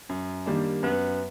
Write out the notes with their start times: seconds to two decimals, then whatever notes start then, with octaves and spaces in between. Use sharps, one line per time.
0.09 F#2
0.46 D#3 G3 A#3 D4
0.83 F#2 B3